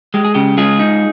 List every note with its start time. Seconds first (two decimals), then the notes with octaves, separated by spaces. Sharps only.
0.14 G#3 G4
0.25 G#4
0.35 C#3 G4
0.58 G#3 F4 G#4
0.79 D#4